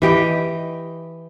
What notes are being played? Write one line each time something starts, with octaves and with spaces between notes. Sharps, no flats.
E3 G4 D#5 G5